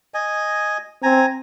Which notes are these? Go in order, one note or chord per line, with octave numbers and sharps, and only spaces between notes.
D#5 G#5
C4 G#5 A#5